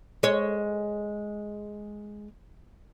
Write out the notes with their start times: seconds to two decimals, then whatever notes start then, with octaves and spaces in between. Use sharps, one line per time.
0.23 G#3 C#5